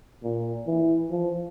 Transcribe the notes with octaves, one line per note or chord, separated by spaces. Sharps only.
A#2
E3
F3